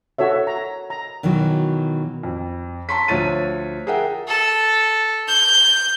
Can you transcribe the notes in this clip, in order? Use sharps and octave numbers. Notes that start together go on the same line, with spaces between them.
F#4 A4 C#5 E5
A#5
A#5
B2 D#3 E3 F#3
F2
A5 A#5 C6 C#6 B6
D2 F3 C#5 A6 D#7
G#4 A#4 E5 F#5 G5
A4
G6